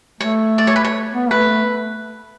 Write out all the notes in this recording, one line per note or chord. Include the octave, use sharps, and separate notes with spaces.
A3 C#5
D5
C#5
B4
C#5
B3
A3 B4